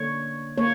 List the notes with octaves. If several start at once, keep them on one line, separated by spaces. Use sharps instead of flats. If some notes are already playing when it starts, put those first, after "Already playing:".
Already playing: D3 A#3 C#5
A#3 C#5